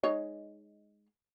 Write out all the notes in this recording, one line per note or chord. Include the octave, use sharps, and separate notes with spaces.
G#3 D#4 C#5